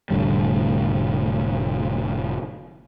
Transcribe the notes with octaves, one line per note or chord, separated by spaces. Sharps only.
F1 A2 D3 G3